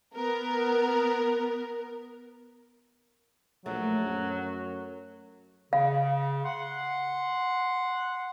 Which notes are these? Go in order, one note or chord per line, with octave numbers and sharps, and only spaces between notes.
B3 A#4
A#1 F#3 A3
F#2
C#3 F5
F#5 C6